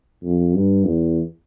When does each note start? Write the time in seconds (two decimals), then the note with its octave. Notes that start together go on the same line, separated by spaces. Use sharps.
0.24 F2
0.54 G2
0.86 E2